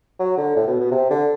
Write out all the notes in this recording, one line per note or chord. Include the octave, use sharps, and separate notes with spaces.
F#3
D3
A2
B2
B2
C3
D3